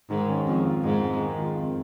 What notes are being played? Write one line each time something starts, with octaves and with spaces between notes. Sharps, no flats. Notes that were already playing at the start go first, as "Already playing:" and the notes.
G#2 D#3
C#4
F2 D#3
F4
F2 G#2
G#3
D#3
F4
F2